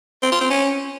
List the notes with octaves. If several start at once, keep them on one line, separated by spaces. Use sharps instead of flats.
C4
F4
C4
C#4